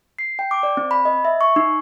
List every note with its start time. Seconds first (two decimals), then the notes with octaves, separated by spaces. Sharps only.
0.19 C7
0.39 G5
0.51 D6
0.63 D5
0.77 C4
0.91 B5
1.05 D#5
1.25 E5
1.41 C#6
1.56 D#4